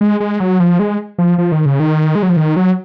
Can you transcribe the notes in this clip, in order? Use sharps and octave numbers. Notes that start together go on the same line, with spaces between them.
G#3
G#3
F#3
F3
G#3
F3
F3
D#3
C#3
D#3
G#3
F#3
F3
D#3
F#3